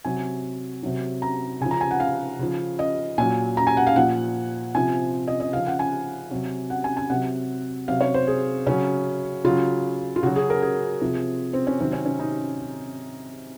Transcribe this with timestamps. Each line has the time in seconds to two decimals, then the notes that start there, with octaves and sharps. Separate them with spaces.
0.05 C3 F#3 G#5
0.83 C3 F#3
1.22 A#5
1.61 C#3 G#5
1.65 F3
1.71 A#5
1.81 G#5
1.91 F#5
2.00 F5
2.39 C#3 F3
2.79 D#5
3.18 A#2 F#3 G#5
3.57 A#5
3.67 G#5
3.77 F#5
3.87 F5
3.96 A#2 F3 F#5
4.75 C3 F3 G#5
5.28 D#5
5.40 D#5
5.53 C#3 F3 F5
5.67 F#5
5.79 G#5
6.31 C3 F#3
6.70 F#5
6.84 G#5
6.97 G#5
7.10 C3 F#3 F#5
7.88 C3 F#3 F5
8.01 C#5
8.14 C5
8.27 G#4
8.67 C#3 F#3 C#4
9.44 C#3 F#3 F4
10.16 F4
10.23 C#3 F#3 F#4
10.36 G#4
10.50 A#4
10.62 G#4
11.01 C3 F3
11.53 C4
11.67 C#4
11.80 C3 D#3 F#3 C4
11.93 C#4
12.06 C#4
12.19 D#4